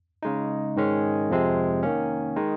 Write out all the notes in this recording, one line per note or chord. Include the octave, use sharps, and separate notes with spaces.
C#3 G#3 D#4
G#2 D#3 G#3 C#4
F2 C3 F3 G#3 C4
D#3 A#3 C#4
D#3 G#3 D#4